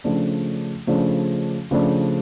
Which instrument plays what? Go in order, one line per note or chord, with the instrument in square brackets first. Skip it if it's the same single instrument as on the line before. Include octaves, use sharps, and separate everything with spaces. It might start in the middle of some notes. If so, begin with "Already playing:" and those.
[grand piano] C#3 F3 A3 D4
C#3 F3 A3 D4
C#3 F3 A3 D4